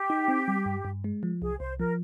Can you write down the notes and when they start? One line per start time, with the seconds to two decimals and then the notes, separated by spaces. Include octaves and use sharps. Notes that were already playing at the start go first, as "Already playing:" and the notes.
Already playing: G4
0.10 D#4
0.28 C4
0.48 G3
0.66 G2
0.85 G2
1.04 G#3
1.23 F3
1.41 C2 G#4
1.60 C2 C5
1.79 F3 A#4